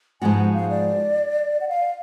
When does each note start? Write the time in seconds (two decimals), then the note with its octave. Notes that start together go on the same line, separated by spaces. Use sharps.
0.21 G#2 F3 G#3 B3 F#4 G#5
0.37 F#5
0.53 F5
0.70 D5
1.61 F#5
1.69 F5